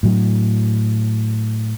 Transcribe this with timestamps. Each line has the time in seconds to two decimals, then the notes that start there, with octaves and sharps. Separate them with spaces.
0.03 A2 F#3